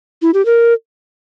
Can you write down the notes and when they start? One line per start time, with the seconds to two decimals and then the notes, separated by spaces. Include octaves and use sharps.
0.22 E4
0.34 G4
0.46 A#4